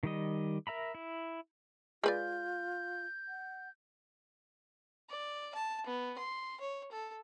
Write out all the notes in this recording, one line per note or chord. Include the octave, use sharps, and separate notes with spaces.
D#3 G3 D#5
A#4 E5 A#5 B5
E4
G#3 F4 B4 D5 G6
F#5
D5
A5
B3
C6
C#5
A4